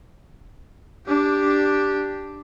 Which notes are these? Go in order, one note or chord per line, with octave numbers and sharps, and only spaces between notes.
D4 G4